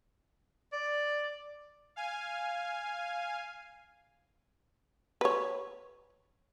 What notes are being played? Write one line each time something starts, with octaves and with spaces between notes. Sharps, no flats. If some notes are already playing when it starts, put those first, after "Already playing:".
D5
F5 G#5
B4 C#5